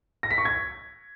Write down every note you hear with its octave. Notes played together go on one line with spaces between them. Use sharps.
A#6
B6
C#6
G#6